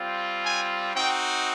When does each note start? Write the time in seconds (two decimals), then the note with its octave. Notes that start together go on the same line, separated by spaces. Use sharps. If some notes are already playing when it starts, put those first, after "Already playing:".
Already playing: G3 C4 F4
0.43 G#5
0.94 C4 D#4 F#4 G5